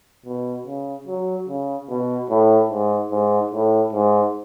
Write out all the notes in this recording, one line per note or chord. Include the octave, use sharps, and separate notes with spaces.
B2
C#3
F#3
C#3
B2
A2
G#2
G#2
A2
G#2